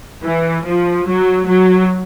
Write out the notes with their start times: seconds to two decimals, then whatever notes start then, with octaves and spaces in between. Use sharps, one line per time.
0.24 E3
0.67 F3
1.07 F#3
1.48 F#3